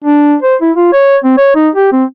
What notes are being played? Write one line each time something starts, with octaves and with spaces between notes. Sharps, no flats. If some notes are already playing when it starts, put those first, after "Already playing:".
D4
C5
E4
F4
C#5
C4
C#5
D#4
G4
C4